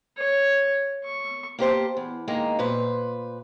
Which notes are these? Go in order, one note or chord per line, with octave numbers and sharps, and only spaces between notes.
C#5
C#6
A#3 G4 C5 A5
E2
D#3 G#3 A#3 D#4
A#2 B4 C5